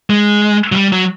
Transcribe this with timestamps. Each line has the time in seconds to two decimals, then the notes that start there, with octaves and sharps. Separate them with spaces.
0.10 G#3
0.72 F#3
0.76 G3
0.92 F#3